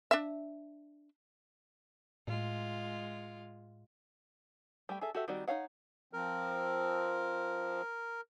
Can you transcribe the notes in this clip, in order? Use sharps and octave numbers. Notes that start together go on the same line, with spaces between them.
D4 E5
A2 G#3 F4
G3 A3 G5
G#4 A4 E5
F#4 G4 A4 E5
D#3 G3 C4 F#4 D5
D#4 G#4 C#5 F5 F#5
F3 C4 A#4